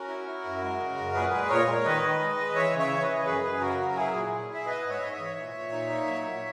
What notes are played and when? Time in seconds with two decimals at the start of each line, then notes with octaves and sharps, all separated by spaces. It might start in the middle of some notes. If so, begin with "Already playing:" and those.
Already playing: C#4 F#4 A#4
0.08 E4
0.26 E4
0.44 F#2
0.61 G#3
0.80 C#3
0.97 F#2
1.14 A#2 G#4 B4
1.33 G#3
1.50 A#2 A#4 C#5
1.68 G#3
1.85 D#3 B4 D#5
2.03 D#3
2.20 G#3
2.37 G#3
2.55 E3 C#5 E5
2.73 C#3
2.78 C#5 E5
2.90 E3
3.02 B4 D#5
3.08 E3
3.25 F#2 G#4 B4
3.44 F#2
3.60 C#3 F#4 A#4
3.79 F#3
3.96 E4 G#4
4.13 A#2
4.31 E4
4.49 E4
4.54 E5
4.66 B3 B4 D#5
4.84 G#2
4.90 C#5 E5
5.02 G#2 D#5
5.13 C#5 E5
5.19 E3
5.37 A#2
5.54 A#2
5.72 D#4
5.89 A#3
6.07 F#3
6.25 A#2